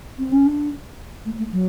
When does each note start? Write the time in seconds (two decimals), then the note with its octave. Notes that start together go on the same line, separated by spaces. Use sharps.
0.19 C4
0.32 C#4
0.46 D4
1.25 A3
1.38 A3
1.52 F#3